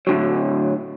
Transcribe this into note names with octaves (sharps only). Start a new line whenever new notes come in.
A2 D3 F#3